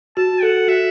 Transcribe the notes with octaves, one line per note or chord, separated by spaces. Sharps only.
F#4 A5
A4 F#5
F#4 E5